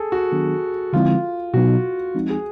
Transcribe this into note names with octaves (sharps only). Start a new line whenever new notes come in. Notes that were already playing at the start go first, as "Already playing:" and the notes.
Already playing: G#4 A4
F#4
D#3 F#3 B3 D4
D3 F3 G#3 C4 E4 F4
B2 F#3 B3 D#4 F#4
F3 G#3 C4 D#4
G#4